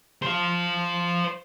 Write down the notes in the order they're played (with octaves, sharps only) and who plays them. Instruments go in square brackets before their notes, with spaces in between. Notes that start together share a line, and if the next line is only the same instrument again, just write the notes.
[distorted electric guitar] C5 F5